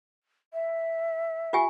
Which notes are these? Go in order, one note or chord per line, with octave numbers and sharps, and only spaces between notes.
E5
F4 G4 G#5